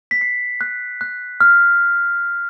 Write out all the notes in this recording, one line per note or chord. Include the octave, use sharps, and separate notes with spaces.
B6
C7
F#6
F#6
F6